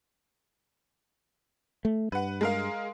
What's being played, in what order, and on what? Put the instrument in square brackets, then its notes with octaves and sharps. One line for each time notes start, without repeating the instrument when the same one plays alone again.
[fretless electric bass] A3
[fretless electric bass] G2 [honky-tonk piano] B4 F#5
[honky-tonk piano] G#3 A#4 F5